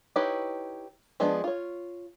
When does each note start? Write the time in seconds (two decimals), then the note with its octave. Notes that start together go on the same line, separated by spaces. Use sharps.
0.16 D#4 E4 G4 B4 C#5
1.20 F3 G#3 B3 D4
1.44 F4 C#5